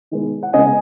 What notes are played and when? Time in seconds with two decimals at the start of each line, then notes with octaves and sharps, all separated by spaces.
0.11 D#3 G#3 B3
0.43 F#5
0.53 C#3 G#3 B3 D#5 G#5